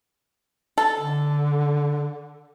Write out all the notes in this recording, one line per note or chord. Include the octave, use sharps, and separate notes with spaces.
A4
D3